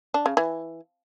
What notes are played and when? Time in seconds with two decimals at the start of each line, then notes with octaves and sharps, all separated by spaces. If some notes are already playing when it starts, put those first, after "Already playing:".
0.14 D4
0.26 C#3
0.37 E3